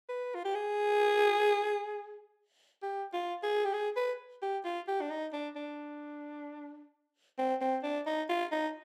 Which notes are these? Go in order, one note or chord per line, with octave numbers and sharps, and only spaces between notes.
B4
F4
G4
G#4
G4
F4
G#4
G4
G#4
B4
G4
F4
G4
D4
D#4
D4
D4
C4
C4
D4
D#4
F4
D#4